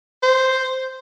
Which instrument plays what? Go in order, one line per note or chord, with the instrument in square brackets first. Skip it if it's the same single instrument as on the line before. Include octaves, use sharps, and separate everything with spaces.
[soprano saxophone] C5